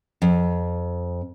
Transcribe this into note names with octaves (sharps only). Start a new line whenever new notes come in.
F2